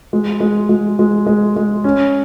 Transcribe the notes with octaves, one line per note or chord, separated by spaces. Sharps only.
G#3
G#3
G#3
G#3
G#3
G#3
C#4